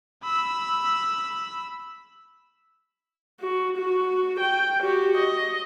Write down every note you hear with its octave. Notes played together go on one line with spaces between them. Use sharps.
B5 E6
F#4
F#4
G5
F#4 G4
D#5